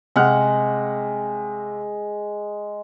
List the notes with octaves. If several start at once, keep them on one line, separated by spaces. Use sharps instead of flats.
C3 G#3 F#5 F6